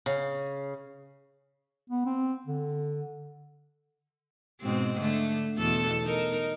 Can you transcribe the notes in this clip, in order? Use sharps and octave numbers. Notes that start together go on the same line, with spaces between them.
C#3
B3
C4
D3
G#2 B2 C4
D3 A3
E2 B2 A4
D#4 A#4